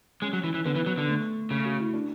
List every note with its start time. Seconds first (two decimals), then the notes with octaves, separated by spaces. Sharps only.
0.22 G#3 C#4
0.33 F#3
0.44 E3
0.54 E3
0.65 D3 B3
0.75 E3
0.86 F#3
0.98 D3
1.08 A3
1.50 C#3 A3
1.65 F#4
1.80 E4
1.93 D4